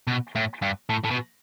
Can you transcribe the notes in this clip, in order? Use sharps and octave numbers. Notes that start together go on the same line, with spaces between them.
B2
A2
G2
A2
A2
B2